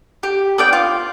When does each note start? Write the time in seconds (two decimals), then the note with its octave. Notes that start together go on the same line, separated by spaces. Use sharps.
0.23 G4
0.58 B3 D5 G5
0.73 F4